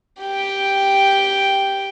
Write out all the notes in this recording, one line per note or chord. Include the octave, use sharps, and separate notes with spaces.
G4 G5